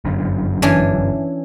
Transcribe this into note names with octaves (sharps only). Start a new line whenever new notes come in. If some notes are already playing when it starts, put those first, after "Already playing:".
G1 F#2 D3
E3 C#4 D4